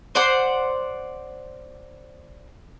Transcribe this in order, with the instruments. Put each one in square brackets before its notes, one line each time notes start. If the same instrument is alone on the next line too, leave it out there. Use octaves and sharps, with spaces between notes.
[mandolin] C5 D5 F#5 C6